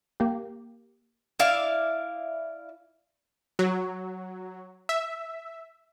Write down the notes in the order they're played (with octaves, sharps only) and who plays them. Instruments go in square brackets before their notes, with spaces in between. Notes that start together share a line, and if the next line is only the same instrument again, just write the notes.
[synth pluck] A#3 G4
[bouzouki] E4 D5 F5
[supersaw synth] F#3
E5